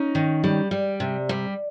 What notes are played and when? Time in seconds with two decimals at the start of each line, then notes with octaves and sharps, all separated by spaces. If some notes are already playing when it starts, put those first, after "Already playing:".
Already playing: C#4 D#4
0.15 D#3
0.44 G3
0.71 G3
1.00 C3
1.29 G3